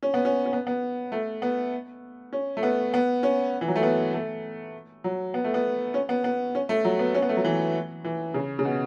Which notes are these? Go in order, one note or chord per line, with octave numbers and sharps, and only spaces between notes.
C#4
B3
C#4
C#4
B3
B3
A3
B3
C#4
A3
B3
B3
C#4
E3
F#3
A3
B3
A3
F#3
B3
A3
B3
C#4
B3
B3
C#4
A3
F#3
B3
C#4
B3
A3
F#3
E3
E3
C#3
C#3
B2